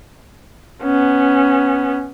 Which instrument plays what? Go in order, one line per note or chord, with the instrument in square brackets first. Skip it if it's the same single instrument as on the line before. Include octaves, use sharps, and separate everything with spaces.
[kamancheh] B3 C#4